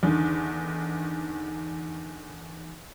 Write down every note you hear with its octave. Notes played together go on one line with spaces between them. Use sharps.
E2 D3 D#3